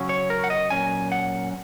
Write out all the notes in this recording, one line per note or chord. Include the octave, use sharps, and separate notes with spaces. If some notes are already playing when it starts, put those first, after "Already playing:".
Already playing: C#3 F#3 C#4
C#5
A#4
F#5
D#5
A#2 F#3 C#4 G#5
F#5